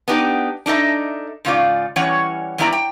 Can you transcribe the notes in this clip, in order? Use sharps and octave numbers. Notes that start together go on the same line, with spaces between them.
B3 D4 D#4 G4
D4 D#4 A4 D#5 E5
G#2 C#3 D#4 F4 D5
E3 G3 C#4 C#5 F#5
E2 G3 B3 E4 D5 A#5
G5